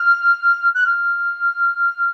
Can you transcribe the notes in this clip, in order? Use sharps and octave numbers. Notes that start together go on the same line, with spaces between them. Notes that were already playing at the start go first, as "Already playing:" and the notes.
Already playing: F6
F#6
F6